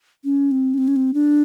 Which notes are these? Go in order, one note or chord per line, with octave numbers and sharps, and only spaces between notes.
C#4
C4
C#4
C4
C#4
C4
D4